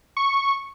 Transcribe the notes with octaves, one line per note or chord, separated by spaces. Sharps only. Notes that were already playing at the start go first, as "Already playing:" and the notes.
C#6